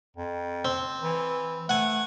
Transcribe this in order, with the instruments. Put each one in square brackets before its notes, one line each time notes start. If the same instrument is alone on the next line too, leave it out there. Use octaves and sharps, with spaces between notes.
[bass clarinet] F2
[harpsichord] C4
[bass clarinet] E3
[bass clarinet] A3 [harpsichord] F#5 G#5